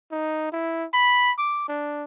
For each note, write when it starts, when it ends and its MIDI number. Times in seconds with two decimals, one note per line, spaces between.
0.12 0.51 63
0.52 0.85 64
0.94 1.31 83
1.38 1.66 86
1.68 2.05 62